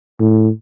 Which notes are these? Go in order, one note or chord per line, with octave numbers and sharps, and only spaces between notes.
A2